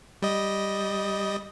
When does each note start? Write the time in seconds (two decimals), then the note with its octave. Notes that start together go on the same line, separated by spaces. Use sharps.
0.22 G3 D#5